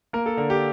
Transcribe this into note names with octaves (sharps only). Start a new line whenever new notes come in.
A#3 A#4
A4
D3 A#4
G4